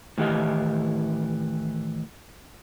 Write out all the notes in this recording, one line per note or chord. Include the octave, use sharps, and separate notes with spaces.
A2 D#3 E3 G4 D#5 F5